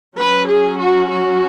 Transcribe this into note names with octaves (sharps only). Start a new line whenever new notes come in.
F#3 C#4 B4
G#4
F#4
F#4